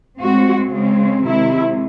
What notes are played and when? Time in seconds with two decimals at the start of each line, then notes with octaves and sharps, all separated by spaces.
0.20 A2 G#3 C4 F#4
0.73 C#3 G#3 C4
1.25 C3 D#3 G#3 C4 E4